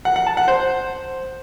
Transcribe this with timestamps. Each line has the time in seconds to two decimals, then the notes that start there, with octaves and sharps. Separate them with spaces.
0.05 F#5
0.16 F#5
0.27 A5
0.37 F#5
0.48 C5